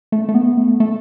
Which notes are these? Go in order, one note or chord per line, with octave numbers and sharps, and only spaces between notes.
A3
A3
B3
A3
A3